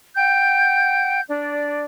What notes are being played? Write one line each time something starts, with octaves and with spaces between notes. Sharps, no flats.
F#5 G5 G6
D4 D5